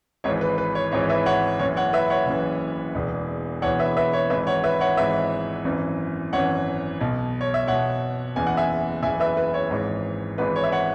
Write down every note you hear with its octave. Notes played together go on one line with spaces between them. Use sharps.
G#1 G#2 E3 C#5
B4
B4
C#5
G#1 G#2 E3 C#5
B4 E5
C#5 F#5
F#1 F#2 E3 C#5
C#5 F#5
B4 E5
C#5 F#5
F#1 F#2 E3
E1 E2 E3
E1 E2 E3 C#5 F#5
B4 E5
B4 E5
C#5
G#1 G#2 E3 B4 E5
C#5 F#5
B4 E5
C#5 F#5
G#1 G#2 E3 B4 E5
G#1 F#2 E3
G#1 F#2 E3 C#5 F#5
B1 B2
C#5
E5
B1 B2 C#5 F#5
F#1 E2 E3 G#5
F#5
E5 G#5
F#1 E2 E3 E5 G#5
B4 E5
B4
C#5
G#1 G#2 E3
G#1 G#2 E3 B4
C#5
E5
C#5 F#5